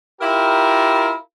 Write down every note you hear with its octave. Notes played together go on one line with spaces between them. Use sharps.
E4 F4 G4 A#4